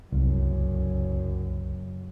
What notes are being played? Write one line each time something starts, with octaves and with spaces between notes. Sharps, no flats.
F#1 C2 F#2